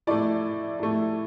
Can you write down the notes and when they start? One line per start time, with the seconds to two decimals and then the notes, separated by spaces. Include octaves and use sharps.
0.07 A2 A3 D5
0.80 A2 A3